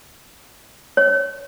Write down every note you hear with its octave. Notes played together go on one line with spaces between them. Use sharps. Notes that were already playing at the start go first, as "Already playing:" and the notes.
C#5